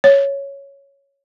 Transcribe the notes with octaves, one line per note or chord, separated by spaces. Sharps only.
C#5